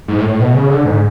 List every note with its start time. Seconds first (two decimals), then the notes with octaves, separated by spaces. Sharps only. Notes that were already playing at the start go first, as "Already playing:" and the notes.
0.08 G#2
0.18 A2
0.29 A2
0.39 B2
0.54 C#3
0.70 D3
0.85 G#2